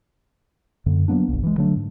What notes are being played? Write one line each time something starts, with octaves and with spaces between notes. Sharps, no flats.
F#2 D3 A#3
F#3 A#3 B3 D4
G1 C2
E3 G#3
D3 F#3 A3 D4
G#2